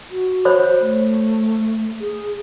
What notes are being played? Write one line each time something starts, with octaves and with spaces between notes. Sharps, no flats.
F#4
C5 C#5 B5
A3
G#4